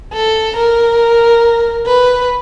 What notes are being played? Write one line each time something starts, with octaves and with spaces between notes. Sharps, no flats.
A4
A#4
B4